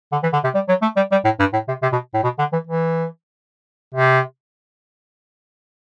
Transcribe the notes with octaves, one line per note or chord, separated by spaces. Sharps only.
D3
E3
D3
C3
G3
F#3
A3
G3
G3
A2
G2
A2
C3
C3
B2
A2
B2
D3
E3
E3
C3